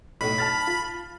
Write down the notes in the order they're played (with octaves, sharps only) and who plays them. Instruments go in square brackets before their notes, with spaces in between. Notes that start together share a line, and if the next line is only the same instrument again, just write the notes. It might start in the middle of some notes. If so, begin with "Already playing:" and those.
[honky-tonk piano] B1 A2 [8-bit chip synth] B5
[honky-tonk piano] A5 F6 A6
F4